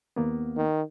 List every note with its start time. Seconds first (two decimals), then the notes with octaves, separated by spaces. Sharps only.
0.16 D#2 A#3 B3
0.56 D#3